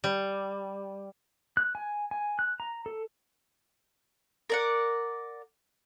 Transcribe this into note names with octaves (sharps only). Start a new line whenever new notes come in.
G3
F#6
G#5
G#5
F#6
A#5
A4
A#4 D5 F#5